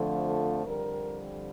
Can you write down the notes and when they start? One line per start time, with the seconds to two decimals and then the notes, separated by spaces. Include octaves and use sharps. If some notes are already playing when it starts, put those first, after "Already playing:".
Already playing: F2 D3 F3 A3
0.26 A4
0.64 F2 D3 G3 A#4